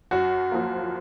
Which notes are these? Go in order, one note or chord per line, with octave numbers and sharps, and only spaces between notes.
F#2 F#4
F3 A#3